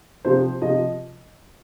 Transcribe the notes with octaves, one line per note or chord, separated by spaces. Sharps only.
C3 F3 C5
C3 F3 D#5